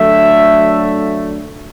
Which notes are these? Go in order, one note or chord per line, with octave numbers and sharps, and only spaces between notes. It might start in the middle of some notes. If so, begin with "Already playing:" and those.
Already playing: D2 D3 F#3 A3 E5